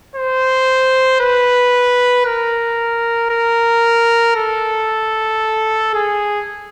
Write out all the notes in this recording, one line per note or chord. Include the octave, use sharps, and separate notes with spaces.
C5
B4
A#4
A#4
A4
G#4